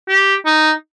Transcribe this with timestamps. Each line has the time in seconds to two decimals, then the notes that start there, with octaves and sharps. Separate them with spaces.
0.09 G4
0.46 D#4